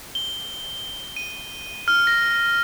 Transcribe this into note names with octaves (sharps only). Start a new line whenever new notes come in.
G7
D#7
F6
A#6